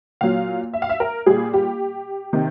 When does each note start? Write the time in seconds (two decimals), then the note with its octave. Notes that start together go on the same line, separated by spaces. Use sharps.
0.21 A#2 F#3 F5
0.74 E5
0.82 F5
0.89 E5
1.00 A#4
1.26 A#2 G3 G#4
1.53 G4
2.33 C3 D#3